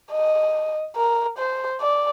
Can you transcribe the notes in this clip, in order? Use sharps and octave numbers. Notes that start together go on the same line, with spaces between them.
D#5
A#4
C5
D5